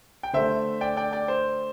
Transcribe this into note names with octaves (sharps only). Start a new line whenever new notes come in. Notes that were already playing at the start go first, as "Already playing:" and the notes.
G5
D3 A3 C5 E5
D5 G5
D5 G5
D5 G5
C5